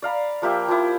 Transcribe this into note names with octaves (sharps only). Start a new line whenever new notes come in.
D5 F5 A#5 B5
F3 A#3 G4 E5
F3 A#3 E4